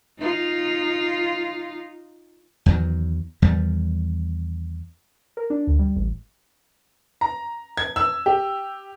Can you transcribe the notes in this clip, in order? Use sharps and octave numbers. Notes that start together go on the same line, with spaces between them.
D#4 F4
E2 D#3 F#3
E2 D#3 G3
A#4
D4
D2
G3
A1
A#5
G#6
E6
G4